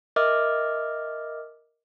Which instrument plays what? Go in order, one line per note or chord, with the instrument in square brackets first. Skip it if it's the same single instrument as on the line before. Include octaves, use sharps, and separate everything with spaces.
[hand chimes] A#4 D#5 E5 D6 F6